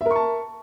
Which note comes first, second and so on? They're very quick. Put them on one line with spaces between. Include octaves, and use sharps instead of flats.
E5 A#4 C#6 A5